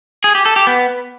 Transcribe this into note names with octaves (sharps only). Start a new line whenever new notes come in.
G#4
G4
A4
G4
B3